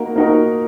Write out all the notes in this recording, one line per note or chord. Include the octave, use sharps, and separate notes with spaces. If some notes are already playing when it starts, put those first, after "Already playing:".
Already playing: A#3 D#4 F#4 A#4
A#3 D#4 F#4 A#4